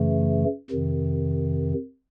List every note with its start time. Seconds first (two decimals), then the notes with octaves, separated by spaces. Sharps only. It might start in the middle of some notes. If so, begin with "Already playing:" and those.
Already playing: F#2 C#3 E3 A3
0.70 F2 C3 D#3